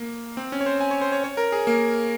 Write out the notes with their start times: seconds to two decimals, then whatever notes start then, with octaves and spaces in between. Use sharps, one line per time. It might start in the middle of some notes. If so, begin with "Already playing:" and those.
Already playing: A#3
0.37 C4
0.52 C#4
0.61 C#5
0.66 C5
0.81 G#5
0.91 C#5
1.02 C5
1.12 C#5
1.24 C#5
1.37 A#4
1.52 G#4
1.67 A#3